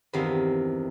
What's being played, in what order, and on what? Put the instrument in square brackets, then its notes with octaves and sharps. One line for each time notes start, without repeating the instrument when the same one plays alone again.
[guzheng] E2 G2 C3 D#3 F5 G#5